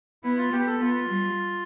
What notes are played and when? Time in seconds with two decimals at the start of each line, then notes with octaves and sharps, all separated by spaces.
0.23 B3 E4
0.38 F4
0.52 B3 G4
0.66 A4
0.80 B3 F4
1.09 G3